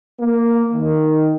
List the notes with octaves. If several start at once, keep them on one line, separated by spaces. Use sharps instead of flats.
A#3
D#3